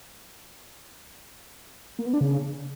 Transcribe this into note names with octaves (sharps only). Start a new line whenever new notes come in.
A#3
B3
D4
C#3